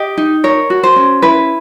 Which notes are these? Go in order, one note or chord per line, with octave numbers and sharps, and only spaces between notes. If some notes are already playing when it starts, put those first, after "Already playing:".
Already playing: G4 D#5
D#4
A#4 C#5
F#4
C5
C#4
E4 B4